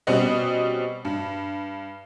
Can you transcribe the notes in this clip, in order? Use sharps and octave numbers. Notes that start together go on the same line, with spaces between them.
B2 G3 C4 C#4 F#4 D#5
G2